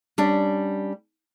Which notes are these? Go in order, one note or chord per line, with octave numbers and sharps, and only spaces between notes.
G3 C#4 D4